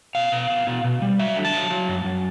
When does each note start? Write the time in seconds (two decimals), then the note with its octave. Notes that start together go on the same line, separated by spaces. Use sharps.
0.15 B2 F5
0.32 B2
0.50 B2
0.67 B2
0.84 B2
1.02 G3
1.19 F#3 E5
1.36 D3
1.45 A5
1.53 F#3
1.70 F#3
1.88 F#2
2.05 F#2